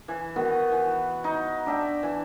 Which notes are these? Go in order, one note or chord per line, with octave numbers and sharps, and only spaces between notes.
E3
D#3 B3 F#4
E3
D#4
D4 E5 G5
E3